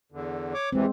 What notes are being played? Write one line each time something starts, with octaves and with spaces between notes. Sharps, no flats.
E2 D3
C#5 D6
E2 C3 E3 G#3 C4